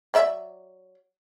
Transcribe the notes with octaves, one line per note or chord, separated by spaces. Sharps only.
F#3 D5 E5